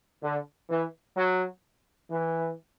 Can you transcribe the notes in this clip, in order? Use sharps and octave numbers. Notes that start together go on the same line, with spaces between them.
D3
E3
F#3
E3